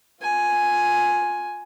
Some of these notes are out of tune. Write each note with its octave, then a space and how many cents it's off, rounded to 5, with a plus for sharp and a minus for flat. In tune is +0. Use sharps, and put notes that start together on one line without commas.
F4 +25 G#5 +5